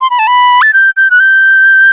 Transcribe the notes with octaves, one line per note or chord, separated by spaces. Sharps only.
C6
B5
A5
B5
A6
G6
G6
F#6
G6